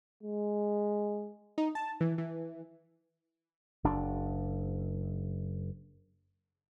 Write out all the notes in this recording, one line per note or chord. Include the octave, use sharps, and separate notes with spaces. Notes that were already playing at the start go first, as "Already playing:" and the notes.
G#3
D#4
A5
E3
E3
F#1 D4